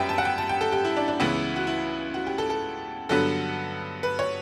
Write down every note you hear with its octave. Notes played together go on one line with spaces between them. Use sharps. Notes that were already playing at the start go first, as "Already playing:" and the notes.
Already playing: F#2 G3 B3 E5 G5
A5
F#5
G5
A5
G5
A4
G4
E4
D4
D4
C#2 C#3 E3 B3 E4
F#4
E4
F#4
G4
A4
A4
G2 D3 F#3 B3 A4
B4
C#5